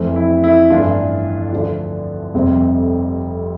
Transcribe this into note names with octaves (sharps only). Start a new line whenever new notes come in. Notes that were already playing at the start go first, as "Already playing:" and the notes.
Already playing: F1 F2 E3 A3 C4
E4
E4
A1 G2 E3 A3 D4 F4
D2 D3 F3
F1 F2 C3 G3 C4